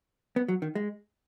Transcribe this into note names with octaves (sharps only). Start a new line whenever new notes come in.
B3
F#3
D#3
G#3